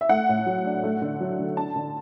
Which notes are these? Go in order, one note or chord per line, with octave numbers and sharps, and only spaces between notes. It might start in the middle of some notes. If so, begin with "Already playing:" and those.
E5
A3 F#5
A2
F#3
D4
A3
D3
F#3
D3
D4 A5
D3